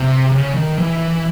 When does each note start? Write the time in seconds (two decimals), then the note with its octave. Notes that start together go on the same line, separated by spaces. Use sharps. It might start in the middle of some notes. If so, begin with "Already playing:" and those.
Already playing: C3
0.32 C#3
0.54 D#3
0.78 E3